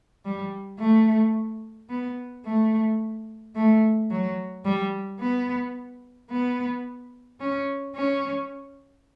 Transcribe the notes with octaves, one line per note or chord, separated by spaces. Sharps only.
G3
A3
B3
A3
A3
F#3
G3
B3
B3
C#4
C#4